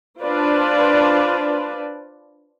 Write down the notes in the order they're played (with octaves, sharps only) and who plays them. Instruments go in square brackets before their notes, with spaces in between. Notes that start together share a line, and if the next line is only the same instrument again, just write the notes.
[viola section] D4 F4 B4 C5 D5